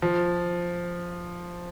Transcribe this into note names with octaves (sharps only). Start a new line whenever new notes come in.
F3